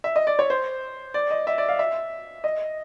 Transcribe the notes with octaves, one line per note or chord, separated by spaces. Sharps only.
E5
D#5
D5
C#5
C5
D5
D#5
E5
D5
F5
E5
D#5